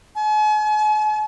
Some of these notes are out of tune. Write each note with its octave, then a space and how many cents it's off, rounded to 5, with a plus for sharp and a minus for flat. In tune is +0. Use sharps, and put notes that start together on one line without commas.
G#5 +45